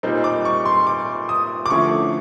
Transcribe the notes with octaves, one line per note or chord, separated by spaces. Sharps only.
A#2 G3 C4 D#4
D6
C#6
C6
D6
D#6
D6
D3 F3 A3 C#4 E4 C#6